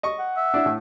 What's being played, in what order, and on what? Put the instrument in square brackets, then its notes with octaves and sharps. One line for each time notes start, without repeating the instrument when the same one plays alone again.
[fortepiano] D#5 C#6
[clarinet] F#5
[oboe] E5
[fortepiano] D4 E4
A2